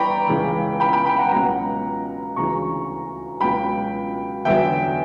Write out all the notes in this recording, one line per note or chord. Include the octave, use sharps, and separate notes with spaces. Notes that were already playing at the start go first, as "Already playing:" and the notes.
Already playing: G2 E3 D5 G5 A#5 B5 C#6
C#2 C#3 E3
G5 B5
G5 B5
G5 B5
F#5 A#5
C#2 B2 F#3 F#5 A#5
D2 C#3 E3 A#5 C#6
C#2 B2 F#3 G5 B5
E2 D3 F#3 E5 G5